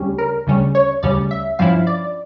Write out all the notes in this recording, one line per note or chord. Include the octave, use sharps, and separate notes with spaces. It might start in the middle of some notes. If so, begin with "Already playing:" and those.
Already playing: D2 C#3 G3 C#4
A#4
D2 C#3 G3 C#4
C#5
D2 C#3 G3 C#4 D5
E5
G2 F3 C#4 E4 F5
D5